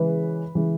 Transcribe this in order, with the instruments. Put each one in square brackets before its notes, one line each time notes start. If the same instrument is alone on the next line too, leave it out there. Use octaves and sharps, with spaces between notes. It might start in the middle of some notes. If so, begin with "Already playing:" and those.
Already playing: [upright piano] C#3 E3 G#3 B4
C#3 E3 G#3